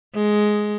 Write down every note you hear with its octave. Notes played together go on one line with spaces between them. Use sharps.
G#3